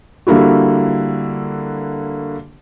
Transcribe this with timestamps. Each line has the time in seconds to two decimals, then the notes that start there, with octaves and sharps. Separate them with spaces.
0.27 D3 G3 A#3 E4 F#4